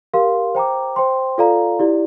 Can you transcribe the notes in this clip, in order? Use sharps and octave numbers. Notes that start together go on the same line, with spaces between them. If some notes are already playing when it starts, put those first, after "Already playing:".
G4 A#4 F5 C6
C5 G5 A#5 D6
C5 G5 C6
F4 A4 D5 F5 A#5
E4 G4 D5